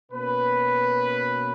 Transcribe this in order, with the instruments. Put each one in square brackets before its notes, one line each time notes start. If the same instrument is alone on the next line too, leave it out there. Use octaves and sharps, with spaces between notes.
[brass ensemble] B2 A#3 C#4 B4